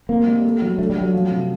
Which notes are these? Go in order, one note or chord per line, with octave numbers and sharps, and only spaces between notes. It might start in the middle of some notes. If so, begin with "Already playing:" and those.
A#3 C4
G3
A3
F#3
A3 D4
G3
A3
F#3
F3
C3